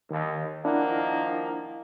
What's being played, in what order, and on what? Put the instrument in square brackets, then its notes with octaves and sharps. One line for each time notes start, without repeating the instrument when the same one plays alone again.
[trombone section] D#2 [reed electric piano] D#3
[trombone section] D#3 F3 A#3 [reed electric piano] D4 E4 F#5